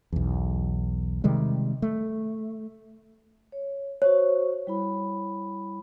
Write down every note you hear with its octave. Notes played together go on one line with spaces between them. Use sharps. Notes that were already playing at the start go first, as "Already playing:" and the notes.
B1 E2
C3 D#3 G3 G#3
A3
C#5
F#4 C5 C#5 C#6
G3 E4 B5